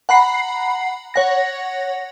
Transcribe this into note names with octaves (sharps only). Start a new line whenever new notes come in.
F#5 A#5 B5 C7
C#5 F#5 A#6